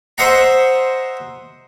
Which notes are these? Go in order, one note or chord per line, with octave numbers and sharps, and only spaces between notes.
C5 D#5 E5 F#5 A#5